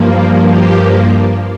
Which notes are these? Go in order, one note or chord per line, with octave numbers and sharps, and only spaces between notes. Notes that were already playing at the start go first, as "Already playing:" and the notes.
Already playing: G2 F3 A#3
G4